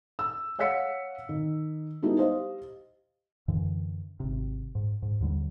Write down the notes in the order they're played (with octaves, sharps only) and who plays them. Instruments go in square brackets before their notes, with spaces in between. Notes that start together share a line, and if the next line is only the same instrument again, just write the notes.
[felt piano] E6
C#5 F5 F#5 E6 B6 C#7
D#3
G3 B3 D#4 E4 F#4 A4
G4 C5 D#5 F5
[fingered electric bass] F#2 D3 E3
G#1 C3
G#2
G#2
D#2 D3 G3